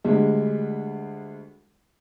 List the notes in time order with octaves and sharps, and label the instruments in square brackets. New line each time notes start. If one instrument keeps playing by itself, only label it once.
[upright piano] D2 G3 G#3